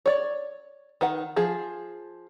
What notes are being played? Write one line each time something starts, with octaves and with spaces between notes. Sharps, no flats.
C#5 D5
D#3 B4 F#5
F3 G#4